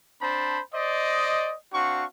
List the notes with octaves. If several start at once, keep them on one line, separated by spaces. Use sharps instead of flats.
C4 D4 C5 A5 B5
C5 D5 D#5
C4 D4 F#4 F5 C#6